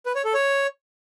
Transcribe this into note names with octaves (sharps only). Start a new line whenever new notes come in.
B4
C#5
A4
C#5